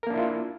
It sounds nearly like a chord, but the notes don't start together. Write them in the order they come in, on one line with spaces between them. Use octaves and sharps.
A#4 A#3 D4 E4 F4